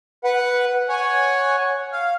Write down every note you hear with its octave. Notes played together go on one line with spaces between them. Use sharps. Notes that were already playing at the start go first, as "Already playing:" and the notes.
B4 F#5
C#5 F#5 G#5
F5